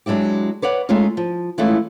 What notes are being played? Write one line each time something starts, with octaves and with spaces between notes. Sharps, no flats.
F#3 G#3 D4 E4 G4
B4 C#5 D5 F#5
G#3 A3 C#4 D#4 F4
F3
E3 G#3 A3 C#4 E4 F4